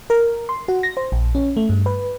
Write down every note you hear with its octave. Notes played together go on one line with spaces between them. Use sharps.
A#4
C6
F#4
A#6
C5
A#1
C#4
A3
G2
B4